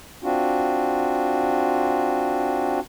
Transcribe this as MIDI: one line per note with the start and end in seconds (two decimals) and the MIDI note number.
0.23 2.80 60
0.23 2.80 62
0.23 2.80 65
0.23 2.80 66